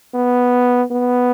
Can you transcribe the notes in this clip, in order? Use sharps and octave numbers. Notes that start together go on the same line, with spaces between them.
B3
B3